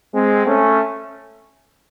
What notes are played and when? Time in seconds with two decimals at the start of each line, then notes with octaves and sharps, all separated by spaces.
0.12 G#3 C4
0.44 A3 C#4